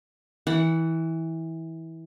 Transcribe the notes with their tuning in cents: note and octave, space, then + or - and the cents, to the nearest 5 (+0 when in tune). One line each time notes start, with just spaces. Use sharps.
E3 -20 F#5 +10